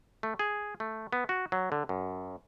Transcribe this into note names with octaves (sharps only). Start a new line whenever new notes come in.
A3
G#4
A3
B3
F#4
F#3
D3
F#2